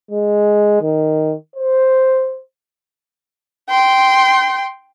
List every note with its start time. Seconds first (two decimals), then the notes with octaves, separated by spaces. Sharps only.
0.11 G#3
0.82 D#3
1.56 C5
3.70 G5 C6